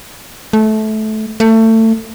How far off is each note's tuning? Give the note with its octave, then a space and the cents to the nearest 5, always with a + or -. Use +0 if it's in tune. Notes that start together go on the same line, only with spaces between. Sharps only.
A3 -20
A3 +25